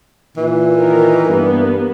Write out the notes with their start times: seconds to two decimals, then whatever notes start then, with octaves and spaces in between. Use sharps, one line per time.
0.37 A#2 E3
0.78 D#3 A#4
1.27 G2 A#3 B3